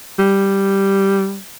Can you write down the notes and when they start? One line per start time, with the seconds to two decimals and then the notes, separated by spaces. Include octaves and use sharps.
0.19 G3